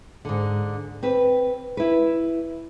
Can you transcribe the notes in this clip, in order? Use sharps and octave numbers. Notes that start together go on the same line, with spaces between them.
G#2 D3
C4 B4
E4 B4